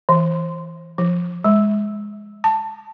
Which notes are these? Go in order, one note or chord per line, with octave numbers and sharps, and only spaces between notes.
E3
F3
G#3
A5